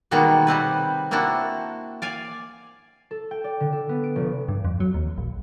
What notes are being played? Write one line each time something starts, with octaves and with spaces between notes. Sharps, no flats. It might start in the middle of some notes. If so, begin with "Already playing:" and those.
B2 D#3 G3 G#3 A#3 F#4
C3 G3 C4 B4
A#3 C4 D4 E4 F#4
D5 F5 G#5
A4
G5
D5
D3
A4
B3
D7
F1
G2
F2
F#3
D#2
A#1